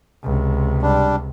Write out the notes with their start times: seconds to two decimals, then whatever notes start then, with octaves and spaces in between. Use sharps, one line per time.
0.23 C#2 C3
0.82 G3 D4